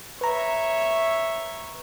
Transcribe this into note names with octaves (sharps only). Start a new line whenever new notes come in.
B4 C#5 E5 A#5